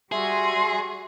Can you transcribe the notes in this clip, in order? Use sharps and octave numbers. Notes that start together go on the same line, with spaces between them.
G3 F#4 G#4 E5 C6